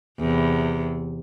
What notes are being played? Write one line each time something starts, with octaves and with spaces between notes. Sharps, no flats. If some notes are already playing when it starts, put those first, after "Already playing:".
E2 C3